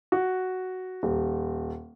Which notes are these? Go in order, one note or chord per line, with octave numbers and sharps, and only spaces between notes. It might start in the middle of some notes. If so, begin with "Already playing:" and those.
F#4
D#1